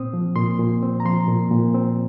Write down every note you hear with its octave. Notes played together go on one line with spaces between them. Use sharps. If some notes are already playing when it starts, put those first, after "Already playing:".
Already playing: A#2 C4 D#6
F3
A#2 C6
A#2
C4
A#5
F3 C6
A#2
A#2
C4